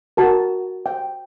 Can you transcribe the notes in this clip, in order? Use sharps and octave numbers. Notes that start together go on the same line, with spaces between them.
F#4 A#4 A5
G5